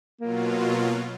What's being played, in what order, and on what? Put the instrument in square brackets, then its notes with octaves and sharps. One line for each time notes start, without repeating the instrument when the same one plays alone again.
[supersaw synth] B2 F#3 F4 [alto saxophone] A#3